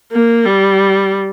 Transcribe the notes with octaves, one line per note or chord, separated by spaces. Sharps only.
A#3
G3